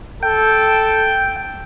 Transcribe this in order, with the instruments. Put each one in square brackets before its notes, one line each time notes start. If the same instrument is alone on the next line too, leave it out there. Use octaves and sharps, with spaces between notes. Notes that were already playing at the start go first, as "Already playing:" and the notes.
[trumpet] A4 [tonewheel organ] G5